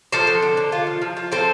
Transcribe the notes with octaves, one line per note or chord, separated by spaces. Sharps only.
F3 A4 C5
D3
D3
D3
F4
F3
F3
F4
C4 A4 C5